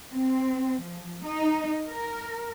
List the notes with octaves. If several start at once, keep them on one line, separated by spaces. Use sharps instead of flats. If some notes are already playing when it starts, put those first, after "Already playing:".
C4
F3
D#4
A#4